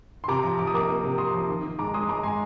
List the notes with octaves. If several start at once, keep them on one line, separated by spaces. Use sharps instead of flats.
C6
C3 A#5 D6
F3
F3 D6
D#6
A#3 A#5 D6
A#3
C3
C3 C6 D#6
F3
D#3
D#3
G#3 A#5 D6
G#3 C6 D#6
G#3 A#5 D6
G#3 G#5 C6